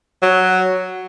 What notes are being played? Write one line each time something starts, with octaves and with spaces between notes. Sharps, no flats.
F#3